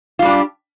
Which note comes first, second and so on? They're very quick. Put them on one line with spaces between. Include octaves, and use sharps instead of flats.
F4 G3 D4 G4